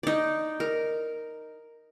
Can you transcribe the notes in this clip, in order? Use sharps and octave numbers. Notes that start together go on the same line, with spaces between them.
D#4 D5
A#4